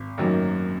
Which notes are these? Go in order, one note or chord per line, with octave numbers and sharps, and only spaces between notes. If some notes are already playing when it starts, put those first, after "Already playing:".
Already playing: G#1
F#2 D#3 F#3 A#3